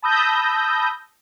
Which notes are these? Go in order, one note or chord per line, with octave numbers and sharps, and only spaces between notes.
A5 B5 D#6 E6 G6 A#6